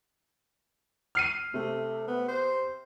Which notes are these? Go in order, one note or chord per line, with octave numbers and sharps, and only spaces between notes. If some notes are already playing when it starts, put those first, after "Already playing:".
F6 C7 D#7
C3 A3
B3
C5